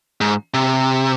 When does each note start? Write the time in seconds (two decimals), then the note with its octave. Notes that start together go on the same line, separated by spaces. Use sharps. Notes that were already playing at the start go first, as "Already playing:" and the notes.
0.21 G#2
0.54 C3